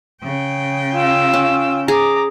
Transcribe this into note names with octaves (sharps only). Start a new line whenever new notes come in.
C#3 G5
F4 E6
C#4
G#4 A#5 D6